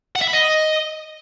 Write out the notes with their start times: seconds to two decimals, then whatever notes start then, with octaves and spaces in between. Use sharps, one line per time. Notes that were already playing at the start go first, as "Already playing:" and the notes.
0.16 F#5
0.22 E5
0.27 B5
0.33 D#5